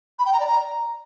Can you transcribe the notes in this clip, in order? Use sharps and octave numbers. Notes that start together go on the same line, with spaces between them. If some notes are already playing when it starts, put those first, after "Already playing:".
B5
G5
A#5
D5
A#5